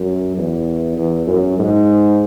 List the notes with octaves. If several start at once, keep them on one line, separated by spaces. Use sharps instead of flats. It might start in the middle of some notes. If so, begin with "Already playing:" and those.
Already playing: F#2
E2
E2
F#2
G#2